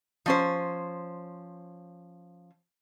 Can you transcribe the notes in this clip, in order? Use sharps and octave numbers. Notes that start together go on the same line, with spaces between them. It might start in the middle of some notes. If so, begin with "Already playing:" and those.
F3 C#4 C5